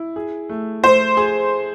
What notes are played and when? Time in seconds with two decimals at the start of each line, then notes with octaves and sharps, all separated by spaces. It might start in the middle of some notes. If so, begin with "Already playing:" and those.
Already playing: E4
0.16 G#4
0.49 A3
0.83 A3 C5
1.17 G#4